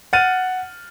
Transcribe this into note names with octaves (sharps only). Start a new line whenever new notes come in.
F#5 F6 A6 D#7